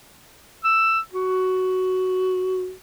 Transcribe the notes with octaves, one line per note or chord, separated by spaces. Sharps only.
E6
F#4